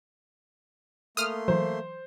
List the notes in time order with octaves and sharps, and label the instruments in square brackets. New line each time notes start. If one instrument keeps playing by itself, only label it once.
[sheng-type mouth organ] A3 A#3 C6 [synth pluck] D#6 F6
[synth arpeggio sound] E3 F#3 [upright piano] C5